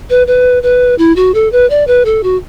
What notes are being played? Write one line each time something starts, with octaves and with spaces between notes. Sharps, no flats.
B4
B4
B4
E4
F#4
A4
B4
D5
B4
A4
F#4